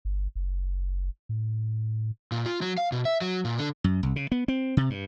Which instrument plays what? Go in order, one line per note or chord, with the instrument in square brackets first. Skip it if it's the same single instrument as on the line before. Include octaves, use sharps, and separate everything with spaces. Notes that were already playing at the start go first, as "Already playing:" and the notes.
[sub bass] G1
F#1
A2
[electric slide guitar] A#2
F4
F#3
F5
B2
E5
F#3
A#2
D3
[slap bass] F#2
C2
C#3
B3
C4
C3
G2